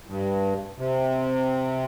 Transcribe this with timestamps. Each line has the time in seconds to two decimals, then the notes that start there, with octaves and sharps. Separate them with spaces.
0.07 G2
0.78 C3